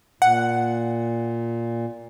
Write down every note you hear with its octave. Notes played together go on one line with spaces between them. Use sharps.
A#2 F#5